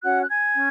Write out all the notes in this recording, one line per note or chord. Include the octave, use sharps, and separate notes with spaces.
C#4 F#4 C#5 F#5 F#6
F#6
G#5 G#6
C#4